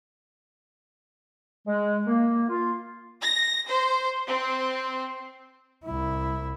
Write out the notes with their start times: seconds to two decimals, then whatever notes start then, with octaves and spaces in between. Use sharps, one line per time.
1.67 G#3
2.06 A#3
2.48 F4
3.21 A#6
3.67 C5
4.25 C4
5.84 C2 E4